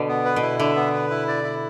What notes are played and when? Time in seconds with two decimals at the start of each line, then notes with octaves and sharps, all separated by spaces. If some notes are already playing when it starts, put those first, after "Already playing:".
Already playing: B2 D3
0.08 B3
0.25 B4
0.36 B2
0.42 E4
0.59 D3 E5
0.75 B3
0.94 B4
1.10 E4
1.28 D5
1.44 E4